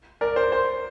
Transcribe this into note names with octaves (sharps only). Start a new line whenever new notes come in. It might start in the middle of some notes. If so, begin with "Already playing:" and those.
A#4 D5
C5
C5